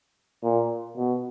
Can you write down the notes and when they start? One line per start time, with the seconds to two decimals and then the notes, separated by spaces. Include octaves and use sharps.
0.43 A#2
0.97 B2